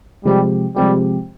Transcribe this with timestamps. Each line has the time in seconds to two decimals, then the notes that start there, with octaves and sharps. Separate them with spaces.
0.25 C3 F3 G3 G#3 C4 G4
0.76 C3 F3 G3 G#3 C4 G4